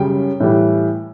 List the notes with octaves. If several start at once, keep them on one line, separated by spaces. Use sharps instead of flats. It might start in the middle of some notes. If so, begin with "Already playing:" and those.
Already playing: F#2 C#3 G3 G5
A2 E3 G3